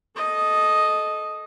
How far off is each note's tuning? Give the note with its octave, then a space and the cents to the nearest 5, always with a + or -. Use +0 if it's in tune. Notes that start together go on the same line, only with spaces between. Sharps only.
A4 -25 D#5 +0